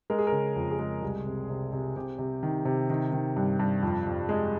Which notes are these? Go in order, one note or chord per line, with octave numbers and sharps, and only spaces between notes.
G#3 A#4
G#4
A#4
C#3
F2
G#4
G#3
C2
C3
C3
C3
C3 G4
C3
D#3
C3
D#3
D#3
G2
G2
F2
F2
G#3